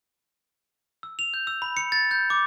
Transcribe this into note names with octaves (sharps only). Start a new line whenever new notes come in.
E6
F7
G6
E6
B5
C#7
A6
G6
D6